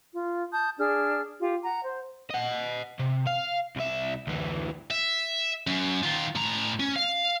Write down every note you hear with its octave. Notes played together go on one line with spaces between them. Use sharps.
F4
A5 D#6 G6
D4 G#4 F6
F4 G4
F#5 A#5
C5
D#5 F#5
C3
F5
C2 E5
D2 E3
E5
F#2
D#3 F4
A2 A#5
C#4
F5